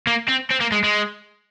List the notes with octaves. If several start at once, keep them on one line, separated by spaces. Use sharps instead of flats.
A#3
C4
C4
A#3
G#3
G#3